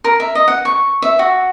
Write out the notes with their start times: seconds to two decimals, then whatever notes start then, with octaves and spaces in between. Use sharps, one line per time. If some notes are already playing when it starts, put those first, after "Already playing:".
0.04 A#4
0.20 E5
0.35 D#5
0.48 F#5
0.65 C#6
1.02 E5
1.19 F#4